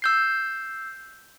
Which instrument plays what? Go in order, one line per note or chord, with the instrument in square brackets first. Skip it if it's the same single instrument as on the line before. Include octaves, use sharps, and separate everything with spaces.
[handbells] E6 G6 C7